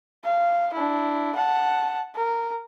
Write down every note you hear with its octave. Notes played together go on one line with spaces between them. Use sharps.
F5
D4 E4
F#5 A5
A#4